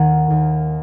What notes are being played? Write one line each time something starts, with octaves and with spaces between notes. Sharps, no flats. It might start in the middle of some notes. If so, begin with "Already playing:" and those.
Already playing: D#2 D#3 F#5 G#5 A#5
D#2